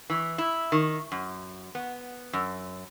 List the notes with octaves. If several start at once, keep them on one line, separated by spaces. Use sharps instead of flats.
E3
E4
D#3
F#2
B3
F#2